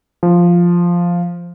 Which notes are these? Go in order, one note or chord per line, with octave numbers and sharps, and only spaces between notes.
F3